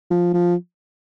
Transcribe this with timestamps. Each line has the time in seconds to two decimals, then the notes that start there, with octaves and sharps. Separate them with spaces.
0.10 F3
0.34 F3